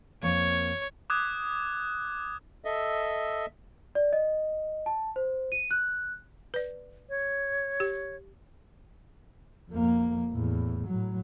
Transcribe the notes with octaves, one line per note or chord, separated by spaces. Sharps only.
F2 A#3 C#5
D6 D#6 F#6 G#6
A4 D#5 E5
D5
D#5
A5
C5
D#7
F#6
B4 D5
C#5
G4
F2 A#3
E2 A2
A2 F#3